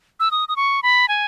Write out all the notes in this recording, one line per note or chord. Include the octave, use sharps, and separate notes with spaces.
E6
D#6
D#6
C#6
B5
G#5